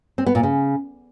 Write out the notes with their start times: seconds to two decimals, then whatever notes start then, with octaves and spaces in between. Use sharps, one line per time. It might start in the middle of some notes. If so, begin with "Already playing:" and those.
0.18 C4
0.26 B3
0.35 A#2
0.43 C#3